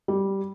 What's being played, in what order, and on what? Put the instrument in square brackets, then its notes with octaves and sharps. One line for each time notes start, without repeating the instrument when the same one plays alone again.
[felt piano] G3